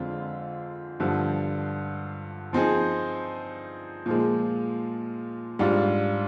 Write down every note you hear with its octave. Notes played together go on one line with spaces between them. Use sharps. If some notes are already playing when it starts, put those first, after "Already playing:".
Already playing: F2 D3 G#3 C4 F4
G2 D3 F3
F3 C4 D#4 G#4
A#2 F3 G#3
G#2 G3 D4 F4